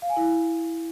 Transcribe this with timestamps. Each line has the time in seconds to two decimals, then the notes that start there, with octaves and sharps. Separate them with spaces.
0.02 F5
0.09 G#5
0.17 E4